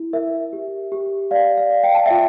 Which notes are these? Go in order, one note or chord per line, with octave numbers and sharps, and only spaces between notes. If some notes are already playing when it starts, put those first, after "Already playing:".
Already playing: E4
A#4 E5
G4
G4
D5 F5
F5
D5
G5
A5
F4 E5 G5